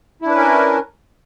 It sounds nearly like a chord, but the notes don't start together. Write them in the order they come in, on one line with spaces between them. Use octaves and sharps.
E4 D4 B4 C#4 A#4